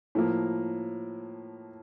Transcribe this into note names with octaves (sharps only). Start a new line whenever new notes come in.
A2 F3 A#3